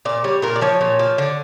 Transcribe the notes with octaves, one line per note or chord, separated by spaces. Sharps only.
A#2 D5
G3 C#5
A#2 A#4
D5
F3 C#5
A#2
F3
D3